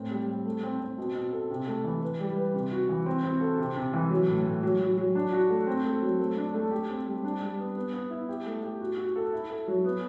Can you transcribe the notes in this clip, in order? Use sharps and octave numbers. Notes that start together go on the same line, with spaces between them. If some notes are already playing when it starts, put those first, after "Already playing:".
Already playing: A2 C4
G3
G4
A3
C4
C4
B2
B2
A4
C3
A3
E3
B4
G3
B4
C3
F#4
E3
C4
C4
A4
C3
C3
E3
F#3
A2
A2
F#3
F#3
F#3
D4
F#4
A3
C4
A3
F#3
A3
D4
A3
G4
C4
G3
D4
G3
B3
B3
B3
E4
G4
A3
G4
F#4
F#4
A4
E4
A4
F#3
B3